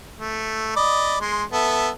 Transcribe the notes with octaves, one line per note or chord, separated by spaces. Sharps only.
A3
D5 D#5 B5
G#3 C6
B3 A4 E5